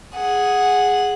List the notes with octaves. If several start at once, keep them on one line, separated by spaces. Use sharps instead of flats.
G#4 F#5